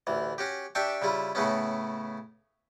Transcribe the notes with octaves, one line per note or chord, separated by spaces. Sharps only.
A1 D2 E3
C#4 F#4 G4
D4 G4 E5 G5 A5 C#6
C#3 G3 E4 F4
A2 C#3 A3 B3 C#4